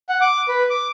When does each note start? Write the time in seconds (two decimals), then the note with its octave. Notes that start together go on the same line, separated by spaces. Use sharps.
0.09 F#5
0.21 D6
0.48 B4
0.70 D6